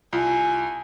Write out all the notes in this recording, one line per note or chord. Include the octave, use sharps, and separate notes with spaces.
C2 F4 G#5